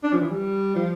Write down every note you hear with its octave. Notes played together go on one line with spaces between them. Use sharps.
D4
F3
E3
G3
F3